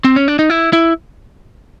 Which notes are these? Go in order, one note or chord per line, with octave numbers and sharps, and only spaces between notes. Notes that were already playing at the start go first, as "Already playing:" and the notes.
C4
C#4
D4
D#4
E4
E4